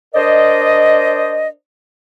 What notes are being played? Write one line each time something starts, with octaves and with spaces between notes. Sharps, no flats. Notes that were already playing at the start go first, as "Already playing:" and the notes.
D4 A#4 C5 D5 D#5